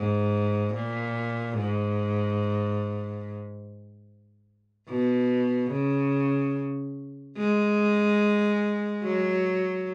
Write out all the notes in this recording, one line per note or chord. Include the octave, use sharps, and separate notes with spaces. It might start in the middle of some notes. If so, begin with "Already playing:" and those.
Already playing: G#2
A#2
G#2
B2
C#3
G#3
F#3